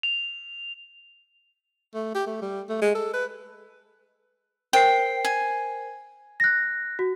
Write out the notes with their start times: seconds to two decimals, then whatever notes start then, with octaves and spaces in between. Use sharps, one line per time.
0.03 F7
1.94 A3
2.15 G4
2.27 A3
2.42 G3
2.69 A3
2.81 G#3
2.95 A4
3.13 B4
4.73 A#4 C5 G5 C7
5.25 G#5
6.40 F#6 A#6
6.99 F#4